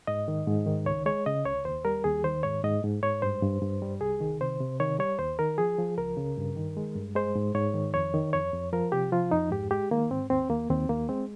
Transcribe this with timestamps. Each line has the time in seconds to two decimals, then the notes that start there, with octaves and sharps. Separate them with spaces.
0.07 G#2 D#5
0.28 D#3
0.47 G#2
0.67 D#3
0.86 C#2 C#5
1.06 G#3 C#5
1.26 C#3 D#5
1.46 C#2 C#5
1.65 D#2 C5
1.85 G3 A#4
2.04 D#2 G#4
2.24 D#3 C5
2.43 G#2 C#5
2.64 G#2 D#5
2.84 G#2
3.03 G#2 C#5
3.22 G2 C5
3.43 G2
3.62 G2
3.82 G3
4.01 C2 G#4
4.21 D#3
4.41 C3 C5
4.61 C3
4.80 D#3 C#5
4.99 G3 C#5
5.19 D#2 C5
5.39 D#3 A#4
5.58 F3 G#4
5.79 F3
5.98 C#2 A#4
6.17 C#3
6.37 G2
6.56 D#3
6.77 G#3
6.96 G2
7.15 G#3 C5
7.35 G#2
7.55 G#2 C#5
7.74 D#3
7.94 F2 C#5
8.14 D#3
8.33 F2 C#5
8.53 F2
8.73 F3 A#4
8.92 C3 G4
9.12 F3 F4
9.31 F2 D#4
9.51 G#2 G4
9.71 G#3 G4
9.91 D#3 A#3
10.11 G#2 C4
10.30 D#2 C4
10.50 D#2 A#3
10.70 D#2 C4
10.89 D#2 A#3
11.09 G#3 C4